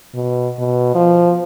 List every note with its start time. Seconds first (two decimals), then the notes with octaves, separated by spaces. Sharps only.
0.14 B2
0.58 B2
0.95 F3